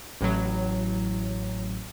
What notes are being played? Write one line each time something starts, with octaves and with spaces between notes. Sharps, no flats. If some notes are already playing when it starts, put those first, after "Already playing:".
A1 A2 F#3